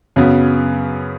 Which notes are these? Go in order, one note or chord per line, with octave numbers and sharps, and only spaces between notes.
F#2 C#3 F#3 B3